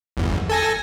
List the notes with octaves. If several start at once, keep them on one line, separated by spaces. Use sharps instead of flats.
G1 E2
A4 G#5 A#6